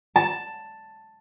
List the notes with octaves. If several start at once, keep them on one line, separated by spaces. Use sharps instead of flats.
A5